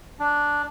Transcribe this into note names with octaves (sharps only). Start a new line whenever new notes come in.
D4